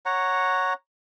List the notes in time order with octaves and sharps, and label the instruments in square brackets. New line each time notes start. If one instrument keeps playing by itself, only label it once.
[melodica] C#5 F#5 A#5